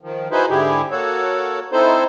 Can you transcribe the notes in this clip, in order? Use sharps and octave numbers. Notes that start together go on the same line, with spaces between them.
D#3 F3
D#4 E4 F#4 G#4 B4 C5
G#2 D3 E4 G4 G#4
A#3 F#4 A4 C#5
C4 D#4 E4 A4 C5